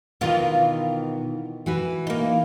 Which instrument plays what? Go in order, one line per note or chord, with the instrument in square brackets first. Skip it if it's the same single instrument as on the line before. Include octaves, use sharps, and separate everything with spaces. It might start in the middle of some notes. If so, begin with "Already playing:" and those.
[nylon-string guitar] B2 A#4 [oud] D#3 E3 F4
[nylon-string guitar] E3 F#4 B4
[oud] A#3 D#4